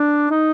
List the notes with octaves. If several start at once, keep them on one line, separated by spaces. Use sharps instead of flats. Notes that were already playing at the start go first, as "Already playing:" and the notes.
Already playing: D4
D#4